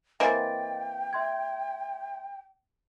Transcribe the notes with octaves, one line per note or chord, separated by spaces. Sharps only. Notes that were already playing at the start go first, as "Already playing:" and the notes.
E3 A#3 C4 D#5 G5 A6
E5 C6 G#6